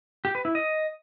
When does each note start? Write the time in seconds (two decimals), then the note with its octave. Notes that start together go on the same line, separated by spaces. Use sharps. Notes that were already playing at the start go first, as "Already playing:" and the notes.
0.25 G4
0.35 B4
0.45 E4
0.55 D#5